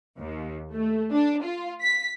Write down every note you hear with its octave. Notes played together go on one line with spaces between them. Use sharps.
D#2
A3
D4
F4
B6